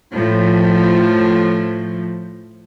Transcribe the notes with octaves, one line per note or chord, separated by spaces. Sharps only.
A2 F3